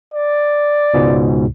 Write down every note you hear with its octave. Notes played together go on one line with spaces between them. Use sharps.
D5
C#2 G#2 B2